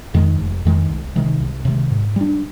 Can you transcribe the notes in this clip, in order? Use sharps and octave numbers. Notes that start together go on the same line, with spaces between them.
F2 D#3 G#3
F1
F2 D#3 G#3
C2
C3 D#3 G#3
C2
C3 D#3 G#3
G#2
G3 D4